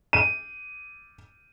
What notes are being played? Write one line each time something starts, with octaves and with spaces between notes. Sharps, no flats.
D#7